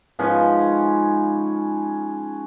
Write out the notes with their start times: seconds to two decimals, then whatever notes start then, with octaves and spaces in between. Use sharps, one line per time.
0.19 G#2 F3 B3 C#4